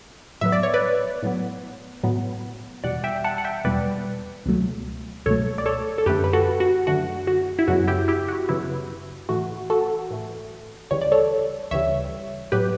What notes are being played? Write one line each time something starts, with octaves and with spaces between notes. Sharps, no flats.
A2 F#3 B3 E5
D5
C#5
B4 D5
A2 F#3 B3
A2 F#3 B3
E2 B2 G3 D5 F#5
E5 G5
F#5 A5
F#5
E5 G5
E2 B2 G3 B4 D5
C#2 B2 F#3 A3
C#2 B2 F#3 A3 A4 C#5
D5
A4 C#5
A4
F#2 D3 A3 G4 B4
B4
F#4 A4
F#4
F#2 D3 A3 F#4
F#4
E4
F#2 C#3 F#3 B3 F#4
E4 G4
E4 G4
F#4
F#2 C#3 F#3 B3 E4
A2 E3 A3 F#4
F#4 A4
A2 E3 A3
D2 C#3 E3 G3 C#5
D5
A4 C#5
D2 C#3 E3 G3 C#5 E5
A2 F#3 B3 G4 B4